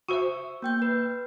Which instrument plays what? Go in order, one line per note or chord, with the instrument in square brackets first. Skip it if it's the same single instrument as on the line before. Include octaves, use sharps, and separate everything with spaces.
[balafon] F#4 C5 E5 [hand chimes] C#6 E6
[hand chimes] A#3 G5 G6
B4